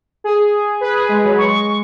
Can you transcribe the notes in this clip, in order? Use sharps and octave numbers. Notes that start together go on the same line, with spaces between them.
G#4
B4
G#4
G#3
F#3
G#3 C#6